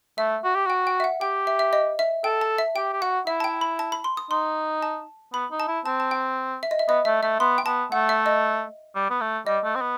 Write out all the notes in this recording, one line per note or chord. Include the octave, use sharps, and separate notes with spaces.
A3 E5
F#4
G4
F#4 G5
G5
E5
F#5
G4 G5
E5
E5
D#5
E5
A4 G5
A5
E5
G4 G5
G4
F#4 F#5
E4 E5
A5
G5
B5
A5
B5
C6
D#6
D#4 C6
A5
B3 B5
D#4
A5
E4
C4 A5
A5
G5
E5
D#5
E5
B3 D#5
A3 E5
A3 E5
B3 C6
G5
B3 A5
A3 F#5
E5
D#5
G3
B3
A3
G3 D#5
A3
C4
B3